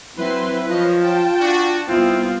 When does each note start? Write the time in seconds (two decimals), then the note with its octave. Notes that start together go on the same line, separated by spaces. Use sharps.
0.17 F#3 C4 E4 B4 C6
0.68 F3 F4 C#5 D#5
1.00 G5 A5
1.40 D4 F#4
1.88 C2 B3 C4 E4 F4